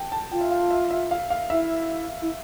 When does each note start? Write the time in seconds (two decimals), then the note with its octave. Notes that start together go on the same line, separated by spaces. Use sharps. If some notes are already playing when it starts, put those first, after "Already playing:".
Already playing: G5 A5
0.12 A5
0.32 F4 G5
0.41 E5
0.51 F5
0.71 E5
0.91 E5
1.11 F5
1.30 F5
1.50 E4 E5
2.22 E4